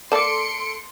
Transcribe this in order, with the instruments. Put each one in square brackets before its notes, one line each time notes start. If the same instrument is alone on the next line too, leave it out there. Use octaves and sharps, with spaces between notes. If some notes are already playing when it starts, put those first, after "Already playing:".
[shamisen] A#3 D5 [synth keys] A4 [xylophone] A5 D6 [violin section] C6 C#7 D7